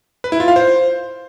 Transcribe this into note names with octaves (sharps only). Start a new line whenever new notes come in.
B4
E4
F4
F5
C5